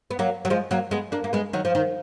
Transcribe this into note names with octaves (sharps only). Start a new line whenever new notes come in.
B3
F#3 A#3
F#3
F3 G#3
F#3 A#3
G#3 B3
A#3 D4
A#3
G#3 B3
D#3 F#3
F3
D#3